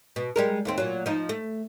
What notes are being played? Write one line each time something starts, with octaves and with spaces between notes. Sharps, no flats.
B2
G3 G#3 A#4
D#2 A3 C4
A#2 F#3
F3 D#4
A3